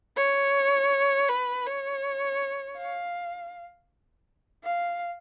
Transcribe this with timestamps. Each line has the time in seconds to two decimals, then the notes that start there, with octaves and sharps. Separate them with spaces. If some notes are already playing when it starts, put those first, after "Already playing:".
0.16 C#5
1.29 B4
1.66 C#5
2.77 F5
4.64 F5